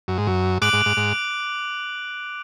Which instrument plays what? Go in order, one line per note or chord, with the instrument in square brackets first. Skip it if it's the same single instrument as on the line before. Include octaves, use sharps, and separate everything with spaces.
[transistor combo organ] F#2
G#2
F#2
[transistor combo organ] G#2 [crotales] D6 F#6 D7 F#7
[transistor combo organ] G#2
G#2
G#2